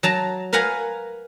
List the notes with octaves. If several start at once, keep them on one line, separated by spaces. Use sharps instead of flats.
F#3 A5 A#5
A#4 B4 F5 F#5 G#5 A#5